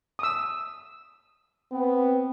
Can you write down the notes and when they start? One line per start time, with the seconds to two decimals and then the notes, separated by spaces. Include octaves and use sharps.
0.19 D#6 E6
1.71 B3 C4